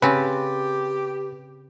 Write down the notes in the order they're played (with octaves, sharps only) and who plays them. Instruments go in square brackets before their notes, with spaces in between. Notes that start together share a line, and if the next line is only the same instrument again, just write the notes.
[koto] C#3 C4 [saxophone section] G4 [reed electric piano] B4 A6